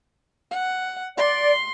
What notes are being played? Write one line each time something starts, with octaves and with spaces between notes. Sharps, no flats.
F#5
D5 C6